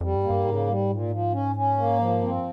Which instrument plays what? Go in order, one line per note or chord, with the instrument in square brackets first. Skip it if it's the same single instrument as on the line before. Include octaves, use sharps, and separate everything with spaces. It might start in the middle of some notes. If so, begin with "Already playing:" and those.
[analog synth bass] F2 [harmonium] G3
[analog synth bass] G2
[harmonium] A#3
[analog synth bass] G2
[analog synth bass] G#2 [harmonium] C#3
[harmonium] G3
A#2
F3
C#4
C#4
A#3
F3
[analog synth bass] G2 [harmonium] C4